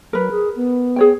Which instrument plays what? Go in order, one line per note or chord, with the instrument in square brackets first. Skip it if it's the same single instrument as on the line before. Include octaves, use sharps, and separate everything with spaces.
[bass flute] F#3 [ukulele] A#4 B4
[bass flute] G#4
B3
[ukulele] G#4 C#5 G5